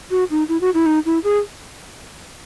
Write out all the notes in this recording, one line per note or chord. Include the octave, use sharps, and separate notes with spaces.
F#4
D#4
E4
F#4
E4
D#4
E4
G#4